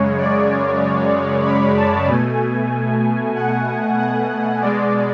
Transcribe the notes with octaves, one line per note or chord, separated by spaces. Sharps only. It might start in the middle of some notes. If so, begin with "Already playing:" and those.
Already playing: F#2 C#3 G#3 C#5
D5
B5
A5
B2 A3 G#5
F#5
F#5
B2 G#3 D5